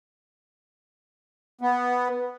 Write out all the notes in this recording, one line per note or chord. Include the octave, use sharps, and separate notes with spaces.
B3